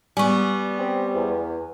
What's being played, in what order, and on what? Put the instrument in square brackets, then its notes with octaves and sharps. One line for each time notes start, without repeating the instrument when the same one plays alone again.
[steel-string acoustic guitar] G3 B3 [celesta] G#5 C#6
[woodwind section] C4 G4
E2